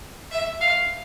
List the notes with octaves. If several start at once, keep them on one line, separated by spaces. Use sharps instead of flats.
E5
F5